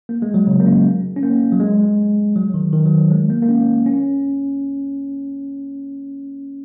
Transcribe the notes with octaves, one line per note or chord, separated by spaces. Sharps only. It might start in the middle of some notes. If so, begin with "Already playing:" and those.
A#3
G#3
F#3
C#3
A#3
C#4
C#4
A#3
F#3
G#3
F#3
D#3
D#3
F#3
G#3
A#3
A#3
C#4
C#4